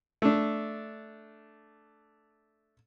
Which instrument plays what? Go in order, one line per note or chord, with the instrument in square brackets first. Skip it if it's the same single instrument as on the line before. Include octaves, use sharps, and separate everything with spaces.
[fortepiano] A3 D4